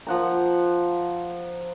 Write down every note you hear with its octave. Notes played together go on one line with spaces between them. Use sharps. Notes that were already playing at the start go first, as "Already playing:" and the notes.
F3 F#5 A#5